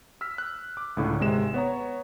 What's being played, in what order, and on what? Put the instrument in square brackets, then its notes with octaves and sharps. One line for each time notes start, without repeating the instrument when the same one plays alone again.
[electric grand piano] E6 F6 B6
F#6
D6
C#2 A2 D3
G#1 C3 G#3 E7
B3 C#5 A#5